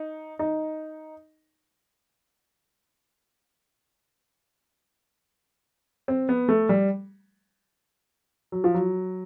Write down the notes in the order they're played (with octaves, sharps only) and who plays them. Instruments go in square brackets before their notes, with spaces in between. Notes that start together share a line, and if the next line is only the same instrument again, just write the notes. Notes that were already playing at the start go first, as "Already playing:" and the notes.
Already playing: [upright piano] D#4
D#4
C4
B3
A3
G3
F#3
F3
F#3